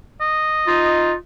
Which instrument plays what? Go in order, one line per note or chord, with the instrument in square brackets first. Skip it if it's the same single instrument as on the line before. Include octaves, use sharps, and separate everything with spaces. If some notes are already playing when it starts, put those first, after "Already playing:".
[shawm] D#5
[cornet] D#4 [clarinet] F4